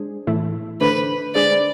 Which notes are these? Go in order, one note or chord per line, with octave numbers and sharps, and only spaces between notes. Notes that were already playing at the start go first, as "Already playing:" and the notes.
Already playing: G#3 D4 G#4 C5
A2 E3 A3 E4
D3 A3 D4 A4 B4 C5
G#3 D4 G#4 C5 D5